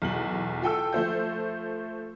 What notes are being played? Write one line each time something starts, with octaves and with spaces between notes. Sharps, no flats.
B1 E2 F#7
F4 A4 G5 E6
F3 A3 C5 G6